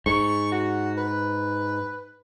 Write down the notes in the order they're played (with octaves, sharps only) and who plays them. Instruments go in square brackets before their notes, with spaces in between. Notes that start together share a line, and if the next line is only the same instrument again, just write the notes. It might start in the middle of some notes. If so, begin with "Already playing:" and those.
[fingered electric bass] G#2 [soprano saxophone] C#6
[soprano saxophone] F#4
B4